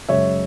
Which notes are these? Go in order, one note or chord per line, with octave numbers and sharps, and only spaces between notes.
F#2 C#3 G#3 C#5 E5